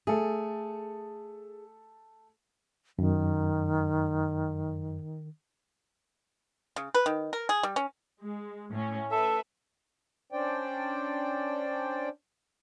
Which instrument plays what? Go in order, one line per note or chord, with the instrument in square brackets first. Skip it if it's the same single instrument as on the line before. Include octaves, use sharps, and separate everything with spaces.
[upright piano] A3 A4 [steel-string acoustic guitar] G#4
[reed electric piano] F#2 [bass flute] D#3
[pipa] C#3
B4
D#3
A#4
G#4
G3
C#4
[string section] G#3
A2 C#4
[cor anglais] A4 [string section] B4 E5
[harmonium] C#4 D4 C5 D5 G5